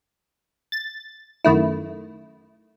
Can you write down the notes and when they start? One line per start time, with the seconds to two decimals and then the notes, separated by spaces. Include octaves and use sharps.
0.72 A6
1.45 F#2 D#3 A3 E4